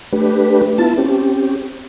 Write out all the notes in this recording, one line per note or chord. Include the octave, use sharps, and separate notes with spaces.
A3 D4 G4 B4
B3 E4 F4 A5
C4 C#4 G4